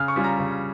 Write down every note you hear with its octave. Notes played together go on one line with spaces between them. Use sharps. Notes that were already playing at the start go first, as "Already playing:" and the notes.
Already playing: C#3 F6
C#6
G3 C#4 F4
A#5
C#3